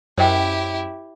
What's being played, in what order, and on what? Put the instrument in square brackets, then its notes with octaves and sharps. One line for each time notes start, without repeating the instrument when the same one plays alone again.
[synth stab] F#2 [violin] E4 G4 [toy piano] C5 D#5 G5